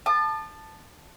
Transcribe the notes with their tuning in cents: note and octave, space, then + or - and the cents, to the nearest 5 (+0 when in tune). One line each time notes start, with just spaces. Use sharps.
A5 +0 D#6 -45